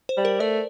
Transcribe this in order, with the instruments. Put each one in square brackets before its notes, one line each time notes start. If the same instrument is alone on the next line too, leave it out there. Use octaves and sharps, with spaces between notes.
[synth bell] C5
[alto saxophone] G3
[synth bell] A#4
[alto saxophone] A3 [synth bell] D5